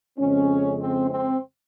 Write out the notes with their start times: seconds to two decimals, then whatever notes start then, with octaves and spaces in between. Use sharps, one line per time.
0.18 F2 C#3 G#3 C4 C#4
0.80 C4
1.10 C4